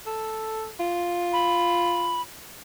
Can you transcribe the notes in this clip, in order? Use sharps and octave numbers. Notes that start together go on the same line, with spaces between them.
A4
F4
B5